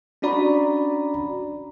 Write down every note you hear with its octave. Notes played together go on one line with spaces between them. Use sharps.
C#4 D4 F#4 D5 A#5 B5